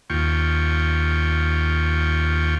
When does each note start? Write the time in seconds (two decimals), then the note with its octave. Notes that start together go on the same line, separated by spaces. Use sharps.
0.10 D#2 F4 G5 C#6